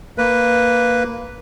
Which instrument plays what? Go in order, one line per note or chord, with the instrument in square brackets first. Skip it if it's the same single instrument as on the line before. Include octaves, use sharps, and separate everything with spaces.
[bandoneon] A#3 B4